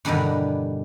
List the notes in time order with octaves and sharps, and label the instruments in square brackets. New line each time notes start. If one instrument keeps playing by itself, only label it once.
[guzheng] E2 G2 B2 D3 D#3